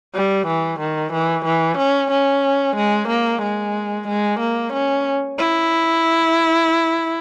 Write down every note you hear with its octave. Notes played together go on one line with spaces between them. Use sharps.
G3
E3
D#3
E3
E3
C#4
C#4
G#3
A#3
G#3
G#3
A#3
C#4
E4